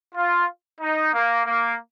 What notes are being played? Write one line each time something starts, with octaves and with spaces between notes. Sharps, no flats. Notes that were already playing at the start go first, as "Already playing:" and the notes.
F4
D#4
A#3
A#3